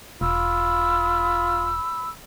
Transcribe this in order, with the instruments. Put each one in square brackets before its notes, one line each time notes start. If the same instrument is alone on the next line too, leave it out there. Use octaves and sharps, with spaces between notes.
[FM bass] E1 [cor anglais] F4 [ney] B5 [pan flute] E6